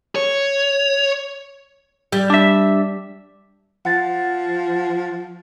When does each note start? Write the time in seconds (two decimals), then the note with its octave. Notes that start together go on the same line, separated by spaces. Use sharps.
0.15 C#5
2.12 G3
2.30 D4 E5
3.85 F3 F#5 A6